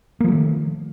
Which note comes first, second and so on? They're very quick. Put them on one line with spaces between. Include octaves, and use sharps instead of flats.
A#3 F3 A3 D#3